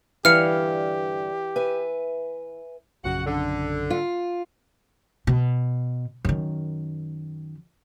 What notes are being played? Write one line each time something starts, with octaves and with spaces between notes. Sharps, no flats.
G2 D3 E3 G4 F5 F6 C#7
B4 E5 G#5
A#1 F#2 C#3 F#4 F#5
D3
F4
B2
F#2 D#3